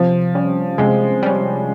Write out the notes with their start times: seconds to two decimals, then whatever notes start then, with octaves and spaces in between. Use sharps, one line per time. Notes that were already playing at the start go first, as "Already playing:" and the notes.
Already playing: C3 F3
0.35 G3 C#4
0.78 C3 G#3
1.22 G3 C#4